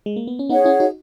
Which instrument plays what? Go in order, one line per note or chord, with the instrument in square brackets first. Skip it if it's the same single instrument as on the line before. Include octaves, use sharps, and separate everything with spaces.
[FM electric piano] G#3
A#3
B3
C#4
[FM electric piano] B3 D#4 [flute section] G#4 C#5 F#5
[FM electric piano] C#4 E4
D#4 F#4